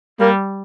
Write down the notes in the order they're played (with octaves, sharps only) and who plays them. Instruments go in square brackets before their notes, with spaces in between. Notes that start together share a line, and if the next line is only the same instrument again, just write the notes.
[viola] G3 [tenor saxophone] A#3